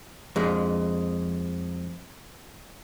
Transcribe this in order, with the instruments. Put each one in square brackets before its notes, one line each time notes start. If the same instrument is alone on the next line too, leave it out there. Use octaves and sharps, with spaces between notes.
[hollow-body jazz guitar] F2 G#3